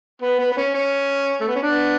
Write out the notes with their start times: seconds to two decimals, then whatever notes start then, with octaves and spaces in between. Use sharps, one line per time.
0.22 B3
0.39 B3
0.52 B3
0.57 C#4
0.74 C#4
1.41 A3
1.48 B3
1.56 C#4
1.62 B3 D4